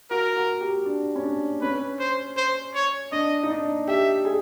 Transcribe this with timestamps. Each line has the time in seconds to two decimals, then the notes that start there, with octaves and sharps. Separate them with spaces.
0.11 F#4 A#4
0.36 F#4
0.61 G4
0.86 D4
1.16 C#4
1.23 D4
1.61 C#4 B4
1.99 C5
2.37 C5
2.75 C#5
3.12 D4 D#5
3.43 D#4
3.50 D4
3.88 G4 E5
4.25 G#4